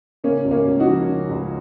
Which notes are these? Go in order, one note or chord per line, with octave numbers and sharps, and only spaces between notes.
C#3 A#3 C#4
C#2
A#3 C#4
C#2
D#4 F#4
F3
C#3
C#2